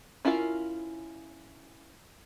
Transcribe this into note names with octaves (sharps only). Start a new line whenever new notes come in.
C#4 E4 F4 A#4 F5